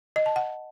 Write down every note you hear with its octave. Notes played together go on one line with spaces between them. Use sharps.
D#5
A5
F#5